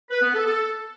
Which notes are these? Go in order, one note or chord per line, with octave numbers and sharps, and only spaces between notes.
B4
B3
A4
A4